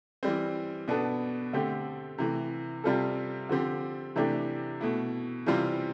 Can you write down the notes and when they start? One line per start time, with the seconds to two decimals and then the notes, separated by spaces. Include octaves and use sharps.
0.23 E3 G3 C4
0.88 B2 B3 D4 A4
1.53 D3 A3 C4 G4
2.18 C3 E3 A3
2.84 C3 G3 C4 F4 A4
3.49 D3 F3 C4 G4
4.16 C3 E3 A3 D4 G4
4.81 B2 A3 E4
5.46 C3 E3 G3 C4 F4